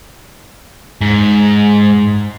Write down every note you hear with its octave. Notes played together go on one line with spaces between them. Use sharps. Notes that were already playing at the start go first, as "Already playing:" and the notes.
G#2